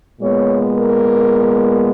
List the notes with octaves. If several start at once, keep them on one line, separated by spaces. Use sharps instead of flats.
A#2 G#3 B3 C#5
A#4